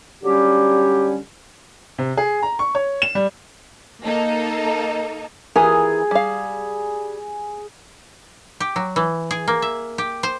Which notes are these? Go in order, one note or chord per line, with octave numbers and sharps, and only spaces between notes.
D3 F#3 G3 C#4 G4
C3
G#4
A#5
C#6
C#5
E7
G3
A#3 D#4 A4
E3 G#4 A#4
G3 F5
G4
F#3
E3
G#4
A#3
E5
G4
C5